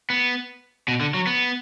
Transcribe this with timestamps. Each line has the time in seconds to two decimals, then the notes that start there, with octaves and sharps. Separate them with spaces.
0.10 B3
0.88 B2
1.00 D3
1.14 F#3
1.27 B3